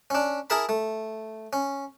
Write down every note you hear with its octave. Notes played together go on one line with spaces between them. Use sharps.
C#4 D4
E4 G#4 A#4 A5 B5
A3
C#4